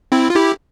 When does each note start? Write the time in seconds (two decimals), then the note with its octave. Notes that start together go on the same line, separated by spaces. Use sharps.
0.12 C4 E4
0.30 F4
0.36 E4 G4